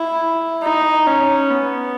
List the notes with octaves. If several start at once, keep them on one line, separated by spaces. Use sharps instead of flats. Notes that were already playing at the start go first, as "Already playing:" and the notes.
Already playing: E4
D#4
C#4
B3